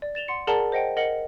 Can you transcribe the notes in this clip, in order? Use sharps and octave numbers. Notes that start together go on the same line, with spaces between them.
D5
A6 E7 F7 G7
F#5 C6 C#7
G#4 A#4 D5 F#5 A5 A#5
C5 D#5 F#5 G5
A#4 D#5 F#5 C#7 F#7